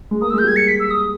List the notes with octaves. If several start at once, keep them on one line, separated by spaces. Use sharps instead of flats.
G#3
A#3 D#6
E6
G#3 G6
G3 G#6
C#7
B6
E6
D#6